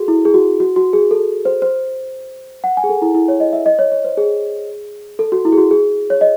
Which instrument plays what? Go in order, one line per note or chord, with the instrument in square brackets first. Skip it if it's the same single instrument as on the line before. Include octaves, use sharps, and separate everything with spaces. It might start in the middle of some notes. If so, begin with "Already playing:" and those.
Already playing: [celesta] F#4 G#4 A4
E4
G#4
F#4
F#4
F#4
G#4
A4
C5
C5
F#5
G#5
G#4
A4
E4
E4
C#5
D#5
E5
D#5
C#5
C#5
C5
G#4
A4
F#4
E4
G#4
F#4
G#4
C#5
D#5